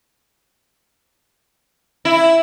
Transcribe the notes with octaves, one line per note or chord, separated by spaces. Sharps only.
E4